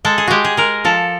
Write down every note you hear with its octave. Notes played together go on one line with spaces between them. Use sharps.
G#3 A4
G#4
G#3 F#4 G4
G#4
G#3 A#4
F3 A4